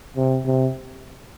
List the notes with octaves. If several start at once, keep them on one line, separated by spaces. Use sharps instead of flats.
C3
C3